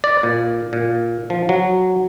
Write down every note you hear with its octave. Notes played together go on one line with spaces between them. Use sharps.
D5
A#2
A#2
F3
F#3